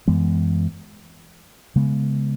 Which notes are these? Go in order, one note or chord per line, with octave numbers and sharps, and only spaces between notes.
F#2 E3 G#3 B3
C#3 G#3 B3